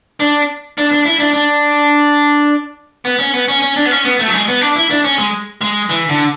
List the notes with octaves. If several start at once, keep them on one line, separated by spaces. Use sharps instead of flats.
D4
D4
D4
E4
D4
D4
B3
C#4
B3
C#4
C#4
D4
B3
C#4
B3
A3
F#3
G#3
B3
D4
E4
D4
C#4
G#3
G#3
E3
D3